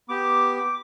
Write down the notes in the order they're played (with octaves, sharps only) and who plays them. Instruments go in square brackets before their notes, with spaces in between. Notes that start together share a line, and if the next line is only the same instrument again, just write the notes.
[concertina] B3 G4 D6